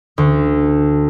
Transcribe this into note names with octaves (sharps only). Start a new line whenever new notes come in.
D2